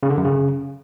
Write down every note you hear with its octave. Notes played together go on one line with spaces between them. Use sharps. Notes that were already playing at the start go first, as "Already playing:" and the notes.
C#3
D3
F#2
C#3